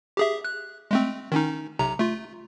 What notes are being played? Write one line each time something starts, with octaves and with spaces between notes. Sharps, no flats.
G4 G#4 E5
F#6
G#3 A3 C4
D#3 C#4 D#4
B1 C3 A#5
A3 F4